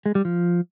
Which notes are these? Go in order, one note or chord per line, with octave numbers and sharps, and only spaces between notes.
G#3
G3
F3